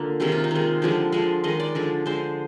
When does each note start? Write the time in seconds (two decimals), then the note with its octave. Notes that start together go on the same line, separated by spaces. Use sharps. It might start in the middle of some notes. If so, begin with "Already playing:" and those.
Already playing: D3 A#3 F4
0.20 C3 D#3 G#3 G4
0.32 F4
0.44 D#4
0.51 D#3 G#3 F4
0.82 D3 F3 G#3 G4
1.12 D3 F3 G#3
1.44 D#3 G#3 D#5
1.60 D5
1.75 D3 F3 G#3
2.06 D3 G#3 C5